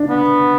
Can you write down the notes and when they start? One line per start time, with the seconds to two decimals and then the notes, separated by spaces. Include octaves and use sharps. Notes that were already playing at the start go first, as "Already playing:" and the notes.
Already playing: D4
0.10 B3